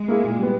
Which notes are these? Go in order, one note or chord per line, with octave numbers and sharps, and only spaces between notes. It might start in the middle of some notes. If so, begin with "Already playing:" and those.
Already playing: G#3
A#3 E4 G#4
A#2
G3 B3